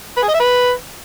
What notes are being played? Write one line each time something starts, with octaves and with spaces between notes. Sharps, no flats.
B4
G#4
D#5
E5
B4